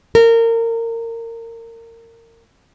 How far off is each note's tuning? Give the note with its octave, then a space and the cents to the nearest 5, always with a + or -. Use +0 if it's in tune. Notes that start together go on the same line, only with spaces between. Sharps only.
A#4 -25